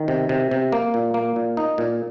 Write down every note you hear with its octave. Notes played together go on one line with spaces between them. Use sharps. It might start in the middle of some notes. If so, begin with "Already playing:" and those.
Already playing: D#3
C3
C3
C3
A#3
A#2
A#3
A#2
D#4
A#2